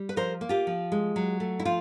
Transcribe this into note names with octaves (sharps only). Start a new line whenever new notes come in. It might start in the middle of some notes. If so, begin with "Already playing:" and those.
Already playing: G3
B4
F3 A#4 C5
A#3
F4 G4
F3
G#3
F#3
A3
E4
F3 F4